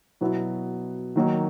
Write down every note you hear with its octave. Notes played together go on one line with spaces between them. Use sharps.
B2 F#3 B3 E4
D#3 F#3 A#3 D#4